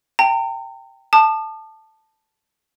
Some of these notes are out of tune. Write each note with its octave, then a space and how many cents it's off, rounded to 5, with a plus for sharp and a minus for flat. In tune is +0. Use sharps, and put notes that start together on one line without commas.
G5 +0 A#5 -40
A5 +0 D#6 -45